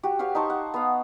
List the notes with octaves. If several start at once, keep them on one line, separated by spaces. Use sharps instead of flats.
F#4 G4
G4 B4 C#5 F5
D#4 C5 A5 C#6
F#5
B3 F5